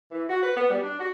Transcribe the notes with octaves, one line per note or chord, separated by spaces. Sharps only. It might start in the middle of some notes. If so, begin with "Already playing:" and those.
E3
F#4
B4
B3
G3
D4
F#4